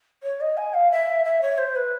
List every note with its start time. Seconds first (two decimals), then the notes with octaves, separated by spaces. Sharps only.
0.23 C#5
0.41 D#5
0.57 G#5
0.74 F5
0.91 E5
1.24 E5
1.42 C#5
1.58 C5
1.75 B4